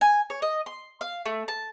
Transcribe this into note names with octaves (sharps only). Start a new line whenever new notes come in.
G#5
C#5
D#5
C6
F5
A3
A5